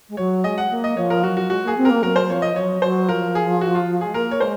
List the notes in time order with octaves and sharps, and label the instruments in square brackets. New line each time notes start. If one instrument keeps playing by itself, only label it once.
[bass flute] G#3
[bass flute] F#3 [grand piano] C#5
[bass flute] G#3 [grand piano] D#5
[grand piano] F#5
[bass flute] A#3
[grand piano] D#5
[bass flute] F3 [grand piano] C#5
[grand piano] A#4
[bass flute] F#3 [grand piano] F#4
[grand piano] F#4
[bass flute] G#3 [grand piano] F#4
[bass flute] A#3 [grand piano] G#4
[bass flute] C4
[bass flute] A#3 [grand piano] A#4
[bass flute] F#3 [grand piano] A#4
[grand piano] C5
[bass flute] F3 [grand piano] C#5
[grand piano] D#5
[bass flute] F#3 [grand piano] C#5
[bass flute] F#3 [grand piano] C5
[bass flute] F3 [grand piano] A#4
[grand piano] G#4
F#4
F4
[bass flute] G#3 [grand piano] G#4
[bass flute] A#3 [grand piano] A#4
[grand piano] C#5
[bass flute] G#3 [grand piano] C5